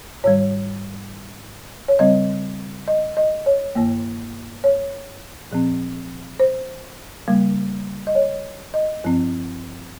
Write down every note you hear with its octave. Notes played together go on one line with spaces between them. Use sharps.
G#2 D#3 G3 C#5
C#5
C#3 G3 C4 D#5
D#5
D#5
C#5
G2 D#3 A#3
C#5
A#2 F3 C4
C5
C#3 G3 A#3
D#5
C#5
D#5
G2 F3 C4